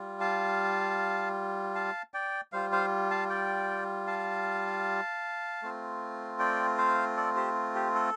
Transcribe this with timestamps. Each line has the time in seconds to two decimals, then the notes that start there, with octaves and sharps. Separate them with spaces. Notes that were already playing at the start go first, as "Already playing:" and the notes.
Already playing: G3 F4
0.20 F5 A5
1.75 F5 A5
2.14 D5 G5
2.52 G3 F4 C5 F5
2.72 C5 F5
3.11 F5 A5
3.29 D5 G5
4.07 F5 A5
5.62 A3 C4 F4
6.39 D5 G5
6.78 C5 F5
7.17 A4 D5
7.36 G4 C5
7.75 G4
7.95 A4